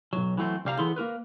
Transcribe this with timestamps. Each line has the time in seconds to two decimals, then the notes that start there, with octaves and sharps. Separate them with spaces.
0.13 B1 F#2 F#3
0.37 E3 F#3 A3 C4
0.65 C2 G3 F5 A#5
0.79 E3 B3 E4 G#4 A4 C6
0.96 A#3 F#4 A#4 B4